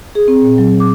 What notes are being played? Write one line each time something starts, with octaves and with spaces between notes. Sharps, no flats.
G#4
C4
A#2
F#3
D6